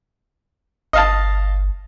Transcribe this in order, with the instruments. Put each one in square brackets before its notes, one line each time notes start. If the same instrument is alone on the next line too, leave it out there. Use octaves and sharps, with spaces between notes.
[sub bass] G1 [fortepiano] D#5 F5 A5